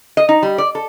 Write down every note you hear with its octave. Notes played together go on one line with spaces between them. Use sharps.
D#5
D#4
G3
D5
A4